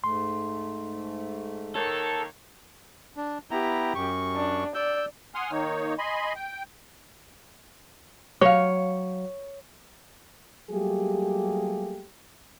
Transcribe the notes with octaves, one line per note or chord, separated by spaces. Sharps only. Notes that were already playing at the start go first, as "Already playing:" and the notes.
G#2 A3 C6
D#3 A#3 A4 C#5
D4
B3 E4 G4 A#5
F#2 C#6
D4
D5 E6 G6
F#5 G#5 C6 D#6 F6
D#3 A#3 D#4 C#5
D#5 G#5 B5 C6
G5
F#3 C#5 F5
F#3 G3 A3 A#3 G4 G#4